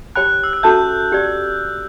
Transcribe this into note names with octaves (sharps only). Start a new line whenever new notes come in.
G4 C#5 G5 B5 F#6
E6
F#6
C#4 F#4 A4 E5 A5 G6
C#4 G4 D5